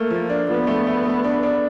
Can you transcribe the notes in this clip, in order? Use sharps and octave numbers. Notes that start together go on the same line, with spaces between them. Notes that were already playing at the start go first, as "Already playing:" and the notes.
Already playing: A3 A#3
F3
D4
F3 B3
A3
A3
A3
D4
D4